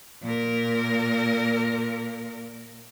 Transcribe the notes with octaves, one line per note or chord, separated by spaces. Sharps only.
A#2 A#4